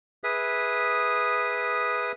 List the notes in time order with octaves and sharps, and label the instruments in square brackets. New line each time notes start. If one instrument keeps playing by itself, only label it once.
[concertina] G#4 B4 E5 D#6